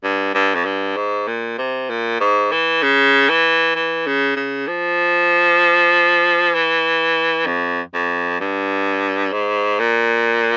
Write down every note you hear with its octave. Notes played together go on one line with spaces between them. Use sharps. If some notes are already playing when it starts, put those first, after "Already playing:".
G2
G2
F2
G2
G#2
A#2
C3
A#2
G#2
E3
C#3
E3
E3
C#3
C#3
F3
E3
F2
F2
G2
G#2
A#2